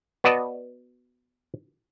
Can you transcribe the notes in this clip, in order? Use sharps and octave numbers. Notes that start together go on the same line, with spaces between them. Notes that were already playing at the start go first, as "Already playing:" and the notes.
B3 F#4 B4 D5 D#5 A5